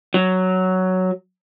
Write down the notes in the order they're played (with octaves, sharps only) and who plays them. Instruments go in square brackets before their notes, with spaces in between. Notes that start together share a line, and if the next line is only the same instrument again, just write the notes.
[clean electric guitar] F#3